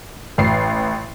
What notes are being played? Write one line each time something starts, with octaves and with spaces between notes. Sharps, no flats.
A1 C7